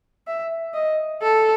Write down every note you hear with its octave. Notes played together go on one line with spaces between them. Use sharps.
E5
D#5
A4